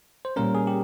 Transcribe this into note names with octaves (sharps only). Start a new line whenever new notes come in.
C5
A#2 G3 A#3 C#4 A#4
G#4
G4